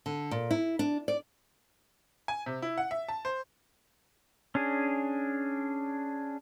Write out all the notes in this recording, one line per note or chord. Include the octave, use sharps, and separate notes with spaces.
D3
A#2
E4
D4
D5
G#5
C3
E4
F#5
E5
A5
C5
C#4 D4 G#4